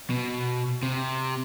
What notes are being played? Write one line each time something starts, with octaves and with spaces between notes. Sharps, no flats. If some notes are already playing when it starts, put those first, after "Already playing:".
B2
C3